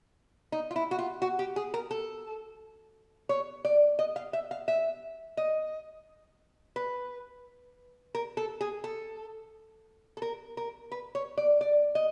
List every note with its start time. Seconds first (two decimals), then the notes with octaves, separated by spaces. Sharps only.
0.52 D#4
0.71 F4
0.76 E4
0.91 F#4
0.99 F4
1.22 F#4
1.39 G4
1.56 G#4
1.74 A#4
1.91 A4
3.29 C#5
3.65 D5
3.99 D#5
4.16 F5
4.33 E5
4.51 F5
4.68 E5
5.37 D#5
6.76 B4
8.15 A#4
8.37 A4
8.61 G#4
8.84 A4
10.17 A4
10.22 A#4
10.57 A#4
10.92 B4
11.15 C#5
11.37 D5
11.61 D5
11.95 D#5